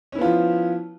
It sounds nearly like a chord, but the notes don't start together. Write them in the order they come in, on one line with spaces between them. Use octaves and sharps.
C#4 E4 B3 F4 F3